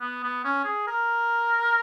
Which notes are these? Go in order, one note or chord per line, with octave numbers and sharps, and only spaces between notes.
B3
B3
C#4
G#4
A#4